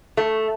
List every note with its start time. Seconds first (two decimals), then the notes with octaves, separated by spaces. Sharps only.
0.17 A3